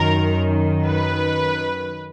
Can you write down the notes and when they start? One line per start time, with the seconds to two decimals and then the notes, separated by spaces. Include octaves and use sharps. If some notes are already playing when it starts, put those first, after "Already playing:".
Already playing: F#2 D#3 A#4
0.86 B4